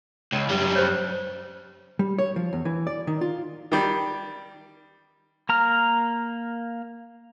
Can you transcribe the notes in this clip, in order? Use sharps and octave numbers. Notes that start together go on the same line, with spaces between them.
C#2
F#2 G3
C5 C#5
G3
C#5
F3
E2
E3
D5
D#3
F4
D#3 G3
A#3 A#5 F6